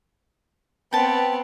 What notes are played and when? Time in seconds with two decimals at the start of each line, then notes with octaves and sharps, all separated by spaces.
0.93 B3 C4 G5 A5